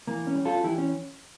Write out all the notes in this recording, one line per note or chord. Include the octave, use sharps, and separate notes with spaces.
E3 A#3
C#4
G3
F4 A4
E3 E4 G4
C#4